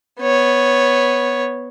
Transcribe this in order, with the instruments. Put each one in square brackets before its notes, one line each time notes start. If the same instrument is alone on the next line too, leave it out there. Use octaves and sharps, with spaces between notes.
[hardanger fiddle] B3 C#5